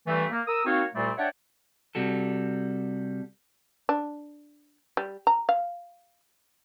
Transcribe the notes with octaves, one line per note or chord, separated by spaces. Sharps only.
G2 E3 G3 A3
A#3
A#4 D#6 E6
A#3 C4 D#4 F#4 C#5 F5
C2 A#2 G3 A3 C4 D5
D4 C#5 E5 F#5 G5 A5
C3 G3 F#4 A4
D4
G3
A#5
F5